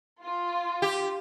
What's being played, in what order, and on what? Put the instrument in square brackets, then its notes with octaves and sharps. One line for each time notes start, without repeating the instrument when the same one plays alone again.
[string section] F4
[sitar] G4